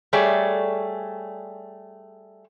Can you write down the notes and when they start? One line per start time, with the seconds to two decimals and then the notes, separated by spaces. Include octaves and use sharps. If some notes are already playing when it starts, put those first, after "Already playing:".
0.13 G3 A3 G#4 C#5 D5